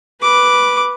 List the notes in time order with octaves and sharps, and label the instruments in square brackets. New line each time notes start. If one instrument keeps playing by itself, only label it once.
[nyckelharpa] B4 D6